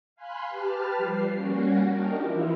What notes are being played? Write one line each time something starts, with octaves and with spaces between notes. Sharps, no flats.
F5 G#5 B5 C6 F#6
G4 B4 A5 F6
F3 G3 C7
G3 A#3 C#4 F#4
D4 D#4 G4 A#4
E3 F3 E4 F4